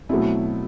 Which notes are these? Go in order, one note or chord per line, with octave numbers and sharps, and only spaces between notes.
B2 F#3 A3 C4 E4